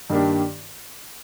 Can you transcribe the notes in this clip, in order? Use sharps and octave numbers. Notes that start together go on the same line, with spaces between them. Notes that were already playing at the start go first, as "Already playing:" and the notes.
G2 D#3 A#3 D4 G4